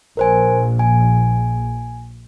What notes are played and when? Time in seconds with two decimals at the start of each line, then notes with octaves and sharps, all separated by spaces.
0.17 A#1 A#4 C5 G#5
0.79 G#5